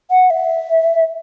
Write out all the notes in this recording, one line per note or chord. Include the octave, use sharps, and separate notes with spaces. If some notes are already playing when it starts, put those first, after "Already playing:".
F#5
E5